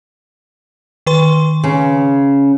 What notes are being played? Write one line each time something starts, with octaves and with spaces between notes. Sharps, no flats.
D#3 B4 C6
C#3